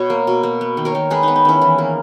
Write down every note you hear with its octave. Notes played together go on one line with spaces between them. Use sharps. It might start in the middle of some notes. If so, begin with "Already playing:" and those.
Already playing: B2 C#5
A#3
B2
A#3
B3
D#3
A#4 C#5
D#3
G#3 G#4 B4
B3 D#4
D#4
D#3 C#4 E4
E3
A#3